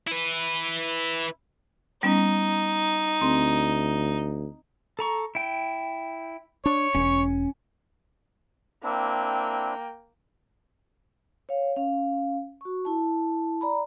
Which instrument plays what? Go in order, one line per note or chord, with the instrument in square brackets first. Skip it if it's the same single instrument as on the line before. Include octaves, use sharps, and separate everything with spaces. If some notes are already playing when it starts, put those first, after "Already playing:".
[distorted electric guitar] E4 B4
[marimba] G3 B3 C#4 [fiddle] D#4
[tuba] D2 [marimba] C4
[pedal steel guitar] A4 A#5 C#6
E4 G5
[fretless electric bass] D4 [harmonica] C#5
[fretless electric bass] E1 [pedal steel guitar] C#4
[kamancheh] A#3 G5 [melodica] C4 D4 E4
[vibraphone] C#5 F5
C#4 F5
F#4 C#6
E4 A5
D5 A#5 B5